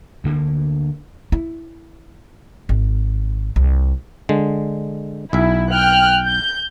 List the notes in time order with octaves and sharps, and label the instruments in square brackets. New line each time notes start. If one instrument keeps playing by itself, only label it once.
[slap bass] D2 D3 A#3
[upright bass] E4
G#1
C2
[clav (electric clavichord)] D3 G#3
[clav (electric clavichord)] B1 E5 [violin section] E4
[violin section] G5 F6 F#6
G6